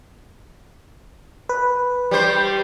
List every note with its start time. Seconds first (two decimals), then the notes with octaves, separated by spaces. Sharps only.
1.49 B4
2.11 G3 C5